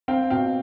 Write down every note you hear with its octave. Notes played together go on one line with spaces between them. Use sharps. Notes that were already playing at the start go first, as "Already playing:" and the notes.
C4 F5 G5
B2 F5 G5